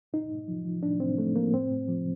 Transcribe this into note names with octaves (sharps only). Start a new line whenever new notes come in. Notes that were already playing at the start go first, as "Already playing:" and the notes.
A2 D#4
A2
F3
F3
A2 D4
A2 C4
F3 A3
F3 A#3
A2 C4
A2
F3